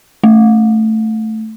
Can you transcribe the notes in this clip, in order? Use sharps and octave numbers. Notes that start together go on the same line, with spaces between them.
A3